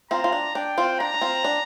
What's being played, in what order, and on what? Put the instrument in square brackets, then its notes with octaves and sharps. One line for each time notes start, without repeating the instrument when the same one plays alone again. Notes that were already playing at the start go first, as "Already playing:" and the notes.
[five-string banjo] C4 F4 [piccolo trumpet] A#5
[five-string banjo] F4
D4
[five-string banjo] D4 [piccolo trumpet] G5
[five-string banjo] C4 F4
[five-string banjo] D4 [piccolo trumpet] A#5
[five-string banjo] D4
C4 F4
D4